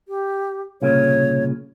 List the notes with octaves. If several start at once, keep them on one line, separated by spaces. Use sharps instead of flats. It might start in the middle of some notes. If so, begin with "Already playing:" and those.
G4
C2 A#2 C#3 C#5